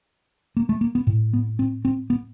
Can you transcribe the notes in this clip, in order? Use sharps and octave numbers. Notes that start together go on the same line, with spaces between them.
A#3
A3
A#3
B3
A2
B3
C4
C4
B3